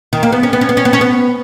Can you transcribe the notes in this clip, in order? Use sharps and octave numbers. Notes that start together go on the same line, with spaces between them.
D#3
A#3
B3
C#4
B3
C#4
B3
C#4
B3
C#4
B3